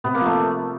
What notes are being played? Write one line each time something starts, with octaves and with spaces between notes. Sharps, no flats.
C3 B3
A#3
F3 A3